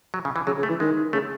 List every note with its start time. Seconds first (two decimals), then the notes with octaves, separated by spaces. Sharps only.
0.14 F#3
0.25 C#3
0.36 E3
0.47 C#3 F#3
0.58 C#3
0.63 A3
0.69 E3
0.80 D#3 G#3
1.13 C#3 A3